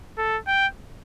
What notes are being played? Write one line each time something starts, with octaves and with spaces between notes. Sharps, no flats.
A4
G5